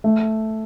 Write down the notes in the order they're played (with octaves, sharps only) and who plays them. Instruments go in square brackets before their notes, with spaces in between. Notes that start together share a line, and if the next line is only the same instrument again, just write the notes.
[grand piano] A3